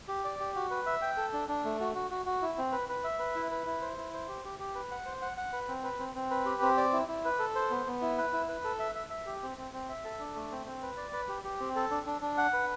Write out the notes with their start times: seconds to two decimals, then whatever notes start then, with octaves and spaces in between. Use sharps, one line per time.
0.08 G4
0.25 D5
0.40 G4
0.56 F#4
0.71 B4
0.86 E5
1.02 G5
1.17 A4
1.33 D4
1.48 D4
1.64 A3
1.80 F#4
1.95 F#4
2.11 F#4
2.26 F#4
2.42 E4
2.58 C4
2.72 B4
2.89 B4
3.04 E5
3.19 B4
3.35 E4
3.51 B4
3.66 E4
3.81 C5
3.98 E4
4.13 C5
4.28 G4
4.45 G4
4.59 G4
4.75 B4
4.91 F#5
5.06 C5
5.22 F#5
5.37 F#5
5.53 B4
5.68 C4
5.84 B4
5.99 C4
6.15 C4
6.30 B4
6.46 G4
6.62 C4
6.77 D5
6.93 E4
7.08 E4
7.25 B4
7.39 A4
7.55 C5
7.70 B3
7.86 B3
8.02 E4
8.18 B4
8.33 E4
8.48 B4
8.64 A4
8.80 E5
8.95 E5
9.10 E5
9.26 G4
9.43 C4
9.58 C4
9.73 C4
9.89 E5
10.05 A4
10.19 D4
10.35 A3
10.51 C4
10.66 C4
10.82 B4
10.97 D5
11.13 B4
11.29 G4
11.44 G4
11.60 C4
11.75 A4
11.91 D4
12.06 D4
12.21 D4
12.38 F#5
12.53 B4